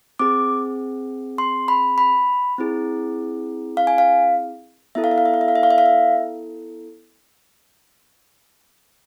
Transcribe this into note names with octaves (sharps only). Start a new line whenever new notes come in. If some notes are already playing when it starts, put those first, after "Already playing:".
C4 G#4 D6
C6
B5
B5
C4 E4 G#4
F5
G#5
F5
B3 E4 A4 E5
F5
E5
F5
E5
F5
E5
F5
E5
F5
E5
F5
E5